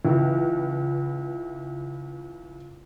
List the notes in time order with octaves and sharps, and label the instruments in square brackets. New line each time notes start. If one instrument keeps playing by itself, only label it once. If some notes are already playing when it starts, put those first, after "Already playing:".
[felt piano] C#2 E3